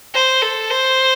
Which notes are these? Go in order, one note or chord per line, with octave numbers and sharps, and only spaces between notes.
C5
A4
C5